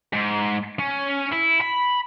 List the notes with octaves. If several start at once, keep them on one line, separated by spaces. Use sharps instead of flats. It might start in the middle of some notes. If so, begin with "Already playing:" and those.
G#2
C#4
E4
B5